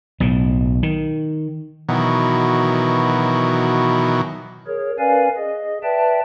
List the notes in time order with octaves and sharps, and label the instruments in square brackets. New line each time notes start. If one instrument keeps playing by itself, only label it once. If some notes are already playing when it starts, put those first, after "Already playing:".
[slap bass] B1 A2
D#3
[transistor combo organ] B2 D#3 E3 F#3
[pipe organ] G#4 A#4 C#5
C#4 A#4 B4 D5 F5 G#5
G#4 D#5
B4 D5 E5 G5 A5